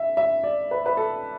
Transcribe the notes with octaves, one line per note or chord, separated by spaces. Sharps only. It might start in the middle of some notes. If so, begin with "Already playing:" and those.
Already playing: E5
E5
D5
B4
B4
A4